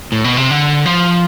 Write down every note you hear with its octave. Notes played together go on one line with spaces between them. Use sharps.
A2
B2
C3
D3
F3